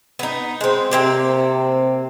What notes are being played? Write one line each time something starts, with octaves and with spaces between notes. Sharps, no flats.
B3 D#4
G#3 C4
C3 A#3 C4 G4